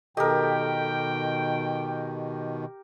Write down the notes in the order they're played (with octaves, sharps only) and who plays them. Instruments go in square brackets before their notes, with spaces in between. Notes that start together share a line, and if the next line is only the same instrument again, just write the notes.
[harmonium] B2 D#3 [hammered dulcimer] G4 A#4 [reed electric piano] A4 D#5 [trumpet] G5